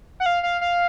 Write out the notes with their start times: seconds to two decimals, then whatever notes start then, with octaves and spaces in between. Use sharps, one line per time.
0.20 F#5
0.26 F5
0.43 F5
0.61 F5